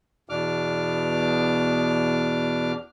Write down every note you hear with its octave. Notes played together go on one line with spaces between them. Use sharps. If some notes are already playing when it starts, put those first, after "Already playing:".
E2 B2 D4 D6 F6